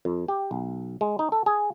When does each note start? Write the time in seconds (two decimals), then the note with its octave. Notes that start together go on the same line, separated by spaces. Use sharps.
0.05 F2
0.28 G4
0.51 B1
1.01 G#3
1.19 D#4
1.32 A4
1.46 G#4